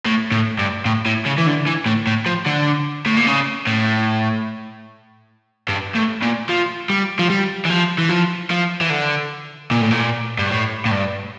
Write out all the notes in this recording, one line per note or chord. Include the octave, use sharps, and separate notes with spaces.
A2
A2
G2
A2
A2
C#3
E3
D3
E3
A2
A2
F3
D3
A2
A#2
C#3
A2
G2
A2
A#2
F3
G3
F3
G3
E3
F3
E3
F3
F3
E3
D3
A#2
A2
A#2
G2
A2
A2
G2